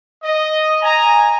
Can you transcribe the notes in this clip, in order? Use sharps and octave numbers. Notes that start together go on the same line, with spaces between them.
D#5
G#5 A#5